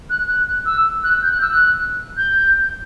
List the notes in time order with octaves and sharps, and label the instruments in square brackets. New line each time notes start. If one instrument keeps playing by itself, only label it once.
[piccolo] F#6
F#6
F#6
E6
F#6
G6
F#6
E6
F#6
G6